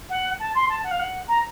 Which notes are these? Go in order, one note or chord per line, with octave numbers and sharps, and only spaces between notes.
F#5
A5
C6
A5
F#5
F5
F#5
A#5